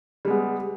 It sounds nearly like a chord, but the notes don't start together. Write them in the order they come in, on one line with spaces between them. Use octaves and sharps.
G3 G#3 B3